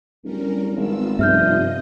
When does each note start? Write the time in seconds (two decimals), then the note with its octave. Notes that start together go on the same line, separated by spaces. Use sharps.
0.24 D1 G3 C#4 A#4
0.76 G#1 B3 F4 E6
1.19 F1 G2 C3 F4 D#5 E5 F6 G6